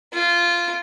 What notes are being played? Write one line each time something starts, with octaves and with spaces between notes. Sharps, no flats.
F4